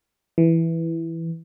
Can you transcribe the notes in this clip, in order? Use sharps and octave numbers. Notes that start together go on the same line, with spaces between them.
E3